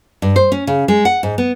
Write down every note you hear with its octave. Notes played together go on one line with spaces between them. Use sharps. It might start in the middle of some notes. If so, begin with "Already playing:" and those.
G2
C5
C#4
C#3
G#3
F#5
G#2
B3